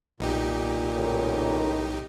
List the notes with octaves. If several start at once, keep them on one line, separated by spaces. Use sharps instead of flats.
B1 A#2 D#4 G4
C#2 A2 D#3